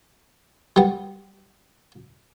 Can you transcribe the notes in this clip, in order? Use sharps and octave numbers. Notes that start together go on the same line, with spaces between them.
G3 B3